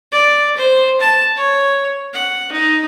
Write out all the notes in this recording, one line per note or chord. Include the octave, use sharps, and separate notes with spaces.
D5
C5
A5
C#5
F#5
D#4